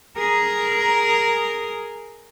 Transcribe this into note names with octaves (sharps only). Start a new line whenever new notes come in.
G#4 A#4